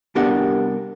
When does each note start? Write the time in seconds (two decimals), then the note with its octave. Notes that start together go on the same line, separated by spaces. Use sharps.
0.15 C2 B3 D4 G4 A#4 F#5